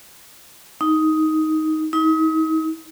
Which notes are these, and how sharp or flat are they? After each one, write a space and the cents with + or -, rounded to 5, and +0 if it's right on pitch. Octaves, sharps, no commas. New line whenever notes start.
D#4 +10
D#4 +35